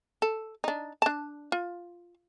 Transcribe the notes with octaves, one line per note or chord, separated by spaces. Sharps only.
A4
D4 D#4
D4 A5
F4